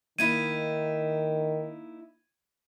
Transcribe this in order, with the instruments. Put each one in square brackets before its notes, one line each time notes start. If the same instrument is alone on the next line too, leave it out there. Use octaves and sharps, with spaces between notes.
[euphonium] D#3 [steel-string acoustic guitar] A#3 D#4 E4 [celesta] G#6 D#7